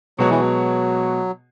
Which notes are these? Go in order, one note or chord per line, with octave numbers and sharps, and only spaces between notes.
B2 F#3 G#3 B3 F#4 C#5
E3
F#3